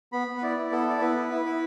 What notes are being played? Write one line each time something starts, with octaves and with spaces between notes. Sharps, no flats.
B3 B5
B3
B4
E4 D5
E4
B3 A4
E4 D5
B3 B4
E4
E4
E4